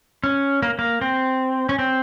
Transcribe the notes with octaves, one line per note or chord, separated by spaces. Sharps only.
C#4
A#3
A#3
C4
C#4
C4